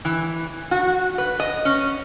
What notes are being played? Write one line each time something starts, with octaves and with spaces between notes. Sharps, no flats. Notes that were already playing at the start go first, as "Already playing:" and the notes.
E3
F#4
B4
D#5
C#4